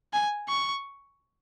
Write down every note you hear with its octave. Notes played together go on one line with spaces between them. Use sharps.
G#5
C#6